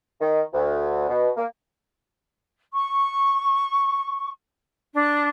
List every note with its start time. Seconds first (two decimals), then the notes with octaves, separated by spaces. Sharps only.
0.21 D#3
0.54 D2
1.09 B2
1.37 A#3
2.73 C#6
4.94 D4